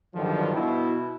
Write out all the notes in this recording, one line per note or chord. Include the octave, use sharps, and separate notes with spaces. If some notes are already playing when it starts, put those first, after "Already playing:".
G2 D3 D#3 F3 F#3
B2 E4